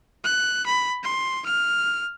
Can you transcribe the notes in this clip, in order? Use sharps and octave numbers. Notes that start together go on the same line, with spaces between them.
F#6
B5
C6
F6